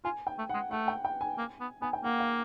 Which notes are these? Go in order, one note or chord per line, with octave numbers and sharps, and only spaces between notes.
F4 G#5
G5
A3
G#3 F#5
A3 F#5
G5
G5
G#5
A#3
B3
B3 G#5
G5
A#3 F#5
F5